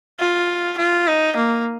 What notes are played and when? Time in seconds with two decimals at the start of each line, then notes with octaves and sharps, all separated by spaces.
0.19 F4
0.78 F4
1.07 D#4
1.37 A#3